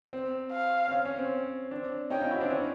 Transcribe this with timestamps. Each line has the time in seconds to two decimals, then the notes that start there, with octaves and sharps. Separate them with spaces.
0.13 C4
0.52 F5
0.88 C4
0.92 C#4
1.06 C#4
1.18 C4
1.71 C4 D4
2.10 C#4 D#4 G5
2.21 D#4 F4
2.31 E4 F#4
2.41 C4 D4
2.50 C#4